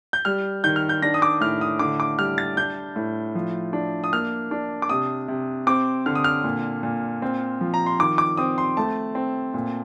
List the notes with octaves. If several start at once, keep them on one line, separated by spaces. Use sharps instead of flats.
G6
G3 F6
D#3 G6
F6
G6
D4 A#6
D#6
D6
A2 F6
D#6
D3 D6
D6
G3 F6
A6
D4 G6
A2
F3
D4
D#6
A#3 F6
D4
D6
C3 D#6
C3
C4 D6
D3 F6
D#6
F6
A#2
A#2
C4
F3
A#5
C6
D#3 D6
D6
C4 D#6
C6
A3 A5
C4
A#2